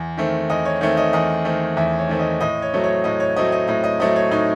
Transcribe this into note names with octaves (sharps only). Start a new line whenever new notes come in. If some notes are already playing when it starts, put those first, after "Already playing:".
Already playing: E2
D#3 A3 C4
E2 D#5
C#5
D#3 A3 C4 C#5
D#5
E2 D#5
D#3 A3 C4
E2 E5
C#5
D#3 A3 C4
D#5
A2 D#5
C#5
F#3 A3 C4
C#5
A2 D#5
C#5
F#3 A3 C4 D#5
D#5
A2 D#5
D#5
F#3 A3 C4 D#5
C#5
A2 D#4